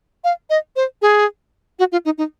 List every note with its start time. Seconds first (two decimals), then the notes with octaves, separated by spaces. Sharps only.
0.24 F5
0.50 D#5
0.76 C5
1.02 G#4
1.79 F#4
1.92 F4
2.05 D#4
2.18 D#4